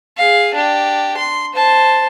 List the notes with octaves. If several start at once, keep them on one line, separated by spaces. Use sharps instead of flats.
G#4 F5
D4 G4
C6
C5 A5